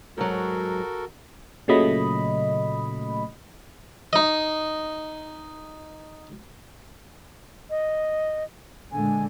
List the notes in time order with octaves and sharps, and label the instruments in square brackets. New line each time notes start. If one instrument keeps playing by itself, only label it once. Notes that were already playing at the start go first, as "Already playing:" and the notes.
[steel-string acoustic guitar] G#2 F#3 [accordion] F#4 A4 A#4
[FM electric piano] A#2 C#3 F#3 A3 D#5 B5
[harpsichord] D#4 D#5
[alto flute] D#5
[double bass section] A#2 D3 G#3 [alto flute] G#5